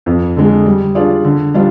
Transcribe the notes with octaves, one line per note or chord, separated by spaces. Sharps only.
F2
D3 G#3
G3
D4 F4 G#4 D5
D3
G3 D4 F4